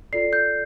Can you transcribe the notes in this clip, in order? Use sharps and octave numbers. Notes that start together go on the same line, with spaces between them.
F4 A4 D5 C7
G6